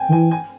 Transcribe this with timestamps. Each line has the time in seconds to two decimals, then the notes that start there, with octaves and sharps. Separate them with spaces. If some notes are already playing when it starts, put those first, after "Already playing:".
Already playing: G5 G#5
0.09 D#3
0.12 E3 G#5
0.31 G#5